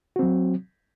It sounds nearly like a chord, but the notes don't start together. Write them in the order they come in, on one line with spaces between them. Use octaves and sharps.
F#4 C4 F#3